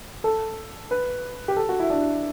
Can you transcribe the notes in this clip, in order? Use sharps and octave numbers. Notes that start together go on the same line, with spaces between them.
A4
B4
G4
A4
F#4
E4
D4